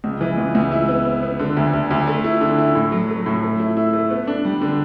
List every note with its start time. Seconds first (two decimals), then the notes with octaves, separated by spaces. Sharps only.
0.04 C#2
0.21 E3
0.38 C#2
0.55 C#2
0.72 E4
0.88 B3
1.05 B3
1.23 B3
1.39 D3
1.57 D2
1.73 D2
1.91 D2
2.07 A3
2.24 E4
2.41 D3
2.58 E4
2.75 A2
2.92 F#3
3.09 A3
3.26 A2
3.43 A3
3.60 E4
3.77 E4
3.93 A3
4.11 B3
4.27 D4
4.45 G3
4.61 D3